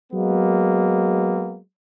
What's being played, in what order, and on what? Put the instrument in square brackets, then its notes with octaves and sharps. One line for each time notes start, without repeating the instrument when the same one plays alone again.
[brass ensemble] F#3 G#3 A#3 B3